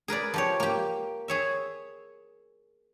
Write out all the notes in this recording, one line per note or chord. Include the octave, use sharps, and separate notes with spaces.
G#4 A#4 B4 D5
F3 G4 C#5
A#3 G4
G#4 C#5 E5